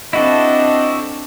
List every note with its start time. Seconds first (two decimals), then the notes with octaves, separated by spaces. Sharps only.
0.13 C4 D4 E4 F#4 A4 D#5